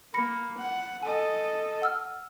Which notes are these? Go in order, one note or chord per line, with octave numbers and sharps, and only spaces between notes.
A#3 B5 A#6 C#7
F#5
A4 D#5 G#5
F#5 E6 F6